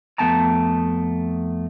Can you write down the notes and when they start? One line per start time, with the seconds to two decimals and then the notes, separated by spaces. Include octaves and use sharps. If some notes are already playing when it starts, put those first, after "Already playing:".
0.18 F2 A3 B3 G5 A5 A#5